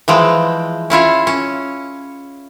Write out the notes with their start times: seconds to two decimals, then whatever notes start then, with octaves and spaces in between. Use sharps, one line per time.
0.08 E3 F3 G#3 G5
0.90 C#4 E4 F4 C#5
1.27 C#4